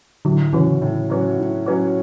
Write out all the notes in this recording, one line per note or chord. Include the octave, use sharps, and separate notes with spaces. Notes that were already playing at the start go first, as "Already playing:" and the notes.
A2 D3 F#3
C#3 E3 F#3 C#4 F#4
A2
F#3 C#4 F#4
A2
F#3 C#4 F#4